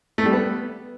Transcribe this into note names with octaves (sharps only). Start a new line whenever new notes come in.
A3
G3
B3